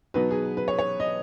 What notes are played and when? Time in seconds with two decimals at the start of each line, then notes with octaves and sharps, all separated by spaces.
0.14 B2 F#3 B3 D#4 B4
0.31 G#4
0.57 B4
0.68 C#5
0.79 C#5
1.00 D#5